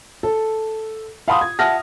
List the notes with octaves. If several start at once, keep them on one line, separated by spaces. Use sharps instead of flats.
A4
F5 F#5 A5 B5 C6 D#6
G#6
E5 F#5 A5 F6 A#6